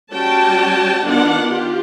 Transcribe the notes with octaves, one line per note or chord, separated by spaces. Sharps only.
G3 C#4 F#4 G5 A5
D#3 B3 D4 F4 F#5
F4 G4